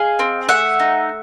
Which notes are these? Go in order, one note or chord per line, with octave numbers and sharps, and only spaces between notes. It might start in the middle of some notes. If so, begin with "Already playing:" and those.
Already playing: G#4 D#5 F5
C4
A3 E5 F#5
D#4